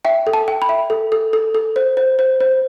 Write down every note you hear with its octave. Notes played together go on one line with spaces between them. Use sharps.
E5 G5
A4
A5
G5
B5
E5
A4
A4
A4
A4
C5
C5
C5
C5